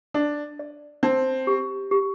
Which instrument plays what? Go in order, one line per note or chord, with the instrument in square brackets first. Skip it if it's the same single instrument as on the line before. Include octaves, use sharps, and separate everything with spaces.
[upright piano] D4 [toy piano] D5
[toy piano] D5
[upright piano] C4 [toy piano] A5
[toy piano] G4
G4